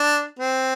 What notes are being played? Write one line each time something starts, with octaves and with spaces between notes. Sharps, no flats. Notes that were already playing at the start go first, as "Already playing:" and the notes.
Already playing: D4
C4